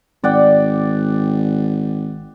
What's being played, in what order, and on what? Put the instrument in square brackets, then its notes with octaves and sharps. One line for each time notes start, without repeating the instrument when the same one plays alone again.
[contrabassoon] G#1 [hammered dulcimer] D5 F#5 G5